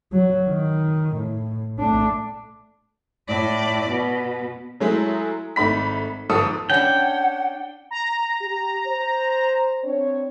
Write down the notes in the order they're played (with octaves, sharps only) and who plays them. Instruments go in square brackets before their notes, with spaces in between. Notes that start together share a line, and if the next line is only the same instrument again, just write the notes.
[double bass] F#3
D#3
A2
A3 D4
[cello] A2 D5
B2
[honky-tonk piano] F#3 G#3 A3 E4
G#1 A3 D#4 B5 B6
G1 G#2 F3 A4 D#6
[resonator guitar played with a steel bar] C#4 D4 [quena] F#5 [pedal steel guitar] G5
[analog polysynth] A#5
[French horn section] G4
C5
C4 D4 C#5